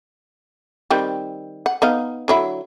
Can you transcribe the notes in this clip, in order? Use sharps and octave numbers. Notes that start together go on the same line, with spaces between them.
D#3 G3 C4
F#5
B3 D#4 F5
D3 F#3 E4